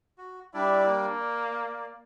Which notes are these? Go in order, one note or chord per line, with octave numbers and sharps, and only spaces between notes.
F#4
G3 D4 E4 D5
A#3
D5